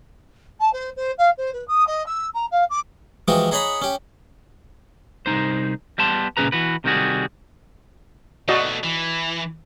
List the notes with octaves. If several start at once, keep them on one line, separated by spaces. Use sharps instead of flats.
A5
C5
C5
F5
C5
B4
D#6
D#5
E6
A#5
F5
D6
E3 F3 G#3 F#4 G4
D#4 G#4 C#5 F#5 A#5 B5
C#4 G4
C2 A#2 D#4 C5
G3 B3 A5 C6
A#2 C#3 C#4 G#4 B4 A#5
E3 F#4 B4
C3 D#3 G3 D#4 F#4 G#4
B2 A3 F#4 D5 D#5
E3